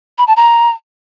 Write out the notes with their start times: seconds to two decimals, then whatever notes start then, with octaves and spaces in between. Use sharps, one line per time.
0.18 B5
0.27 A5
0.36 A#5